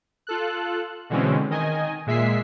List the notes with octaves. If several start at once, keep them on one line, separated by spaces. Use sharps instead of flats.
F4 A4 F#6
B2 D3 E3 G#3 C4 C#4
D#3 D#5 G#5
A#2 G#3 E5 B6 C7